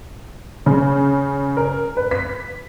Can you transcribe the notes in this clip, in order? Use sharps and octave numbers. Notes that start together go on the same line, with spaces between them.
C#3
A#4
B4
B6